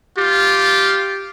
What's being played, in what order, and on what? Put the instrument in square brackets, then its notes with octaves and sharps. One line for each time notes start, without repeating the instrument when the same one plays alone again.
[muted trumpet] F4 [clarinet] G4